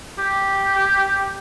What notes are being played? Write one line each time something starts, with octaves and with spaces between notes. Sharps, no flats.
G4